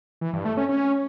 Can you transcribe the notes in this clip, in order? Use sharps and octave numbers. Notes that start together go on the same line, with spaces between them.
E3
G2
A3
C#4
C#4